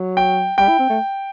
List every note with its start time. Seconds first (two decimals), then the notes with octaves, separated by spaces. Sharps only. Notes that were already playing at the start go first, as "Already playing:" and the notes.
Already playing: F#3
0.17 G5
0.58 G3 G5
0.68 E4
0.79 C4
0.90 A3